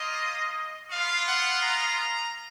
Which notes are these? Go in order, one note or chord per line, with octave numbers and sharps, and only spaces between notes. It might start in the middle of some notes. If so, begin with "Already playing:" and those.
Already playing: A#3 F4 D#5
B3 F4 F5
F#5
A#5